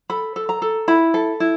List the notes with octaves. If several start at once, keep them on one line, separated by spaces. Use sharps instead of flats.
A4 B5
A4
A#5
A4
E4 B5
A4
E4